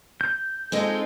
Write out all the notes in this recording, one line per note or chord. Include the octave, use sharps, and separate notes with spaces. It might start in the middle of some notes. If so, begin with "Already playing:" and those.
G6
G#3 C4 D#4 F4 A4